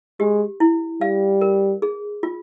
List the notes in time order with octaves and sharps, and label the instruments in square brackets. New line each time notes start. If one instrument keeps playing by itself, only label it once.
[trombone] G#3 [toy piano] G4
[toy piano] E4
[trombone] G3 [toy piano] F5
[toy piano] A#4
G#4
F4